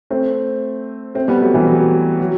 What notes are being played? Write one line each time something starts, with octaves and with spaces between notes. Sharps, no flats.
A3 C4
A3 C4
G3 B3
F#3 A3
E3 G3
F#3
F#3